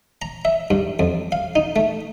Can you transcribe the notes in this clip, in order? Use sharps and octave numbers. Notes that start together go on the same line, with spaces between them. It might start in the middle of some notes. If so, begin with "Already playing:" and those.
A#5
E5
G2
F2
F5
D#4
A3